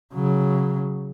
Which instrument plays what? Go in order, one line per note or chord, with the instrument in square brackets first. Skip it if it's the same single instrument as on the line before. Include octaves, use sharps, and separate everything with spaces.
[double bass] C#3 F#3